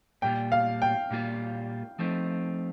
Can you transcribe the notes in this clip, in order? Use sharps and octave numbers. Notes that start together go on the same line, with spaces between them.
A#2 G3 A#3 F4 G5
F5
G5
A#2 G3 A#3 F4
F3 A3 C4 D#4